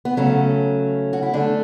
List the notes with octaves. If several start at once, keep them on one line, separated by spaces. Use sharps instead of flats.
B3
C#3 F#3 A3 C#4
F#4
E4
D3 A3 D4